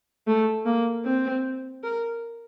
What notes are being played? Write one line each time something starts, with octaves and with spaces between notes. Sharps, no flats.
A3
A#3
C4
A#4